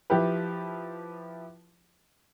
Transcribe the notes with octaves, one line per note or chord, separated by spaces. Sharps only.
F3 E4 G4 B4